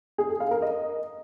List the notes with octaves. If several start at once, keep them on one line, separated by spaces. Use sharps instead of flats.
G#4
A4
F5
A#4
D#5